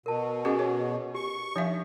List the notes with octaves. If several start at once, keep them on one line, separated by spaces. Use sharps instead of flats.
B2 A#4 A5
C#4 F#4 G#4 D#5 F#5 G#5
G#4 C#5
G4 C#6
F3 D4 D#4 E5 F5